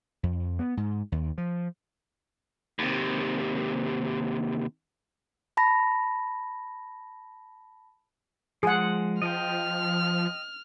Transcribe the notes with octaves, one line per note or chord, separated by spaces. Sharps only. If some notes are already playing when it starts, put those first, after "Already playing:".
F2
B3
G#2
D#2
F3
D#2 C3
A5 B5 A#6
F3 G#3 G#4 F#5
F3 D#5 G5 F6